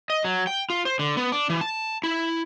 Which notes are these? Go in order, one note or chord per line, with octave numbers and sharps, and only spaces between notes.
D#5
F#3
G5
F4
C5
D3
B3
D4
E3
A5
E4